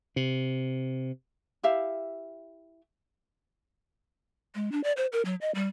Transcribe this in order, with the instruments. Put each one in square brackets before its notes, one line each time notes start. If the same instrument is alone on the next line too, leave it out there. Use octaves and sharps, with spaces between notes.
[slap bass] C3
[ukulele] E4 G4 E5 F5
[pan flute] G#3
D4
D5
C5
A#4
F#3
D#5
G3